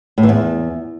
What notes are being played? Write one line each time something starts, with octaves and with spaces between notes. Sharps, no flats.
A2
E3
E2